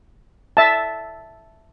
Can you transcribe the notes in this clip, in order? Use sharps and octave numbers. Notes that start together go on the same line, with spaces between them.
E5 A5